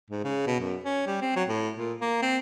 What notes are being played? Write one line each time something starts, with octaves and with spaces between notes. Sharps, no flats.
G#2
C#3
B2
F#2
C#4
G3
C4
F#3
A2
A#2
A#3
C4